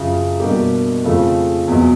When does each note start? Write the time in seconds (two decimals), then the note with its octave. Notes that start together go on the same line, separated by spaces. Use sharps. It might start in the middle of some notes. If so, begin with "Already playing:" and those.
Already playing: F#2 C#3 F3
0.40 B2 G3 A#3 D4 G4
1.04 F2 C#3 F3 A3
1.68 E2 B2 F#3